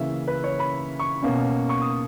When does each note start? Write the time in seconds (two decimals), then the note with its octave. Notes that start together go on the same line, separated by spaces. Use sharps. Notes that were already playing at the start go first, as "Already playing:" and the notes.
Already playing: C#3 E3 A#3 C#4 E5
0.28 B4
0.44 C#5
0.59 B5
1.00 C#6
1.22 B2 A#3 C#4
1.69 C#6
1.82 D#6